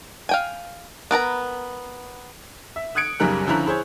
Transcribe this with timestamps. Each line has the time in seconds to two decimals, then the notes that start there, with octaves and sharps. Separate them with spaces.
0.29 F5 G5 G#5
1.11 B3 A#4 A5 A#5
2.76 E5
2.95 D#6 F#6 G#6 C#7 D7
3.20 B1 F#2 C#3 G3 A#4 F#6
3.47 D3 F3 C#4 E4 A#5 F#6
3.66 E4 G#4 C5 C#5